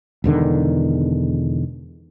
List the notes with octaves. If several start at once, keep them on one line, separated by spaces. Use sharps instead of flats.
E1 E2 D3 D#3